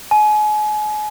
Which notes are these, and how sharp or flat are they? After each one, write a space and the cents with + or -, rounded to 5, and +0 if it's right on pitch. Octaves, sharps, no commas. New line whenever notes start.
G#5 +35